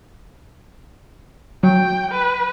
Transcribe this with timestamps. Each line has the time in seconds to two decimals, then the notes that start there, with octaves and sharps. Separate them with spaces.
1.63 F#3 G5
2.10 B4